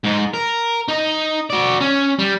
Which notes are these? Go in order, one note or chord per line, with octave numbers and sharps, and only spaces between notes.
G#2 D#4
A#4
D#4 D#5
F#4 D5
C#4
G3